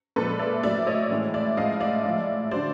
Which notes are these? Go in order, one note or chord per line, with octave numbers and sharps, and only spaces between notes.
A#2 F3 G#3 A4 B4
D5 E5
A2 F#3 D5 E5
C#5 D#5
A2 E3 G#3
D5 E5
A2 F3 G#3 D#5 F5
D5 E5
A2 F3 G#3
D3 F#3 C5 D5